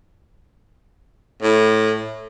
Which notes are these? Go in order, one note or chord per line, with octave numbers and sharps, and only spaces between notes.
A2